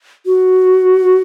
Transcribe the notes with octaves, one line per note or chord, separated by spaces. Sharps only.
F#4